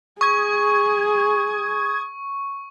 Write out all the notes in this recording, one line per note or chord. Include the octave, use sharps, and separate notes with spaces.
G#4 C#6 D#6 G#6